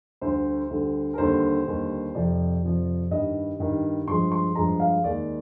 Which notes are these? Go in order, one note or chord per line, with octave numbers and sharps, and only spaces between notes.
D2 D3 G3 C5
D2 D3 G3
A#4
D#2 D3 G3 C5
D#2 D3 G3
F2 C3 F3 D5
F2 C3 F3
G2 D#3 G3 D#5
G2 D#3 G3
G2 F3 G#3 C6
C6
G2 F3 G#3 A#5
F5
D#2 D#3 G#3 D5